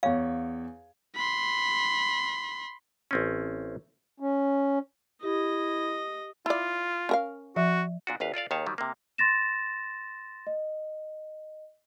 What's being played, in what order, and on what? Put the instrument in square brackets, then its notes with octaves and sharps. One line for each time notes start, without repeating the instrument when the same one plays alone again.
[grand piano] E2 C#5 [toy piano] F5
[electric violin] B5 C6
[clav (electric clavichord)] A1 C4 C#4
[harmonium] C#4
[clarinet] E4 [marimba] G4 [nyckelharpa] D#5
[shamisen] E4 D5 [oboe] F4
[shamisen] C#4 A#4 F5
[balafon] F3 E5 [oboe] F#4
[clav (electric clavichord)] A#2 D4 F#4
G#1 D#2 B4 F5
F4 A4 D5 F5
D#2 D#3 G#4 C#5 A5
D#3 F#3 G3
C3 A#3
[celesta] C6 A6 A#6 E7
D#5